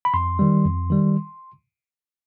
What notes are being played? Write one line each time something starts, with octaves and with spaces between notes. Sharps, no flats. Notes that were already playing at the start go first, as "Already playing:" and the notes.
B5
F2 C6
D#3 G3
F2
D#3 G3